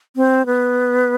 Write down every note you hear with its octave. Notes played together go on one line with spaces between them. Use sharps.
C4
B3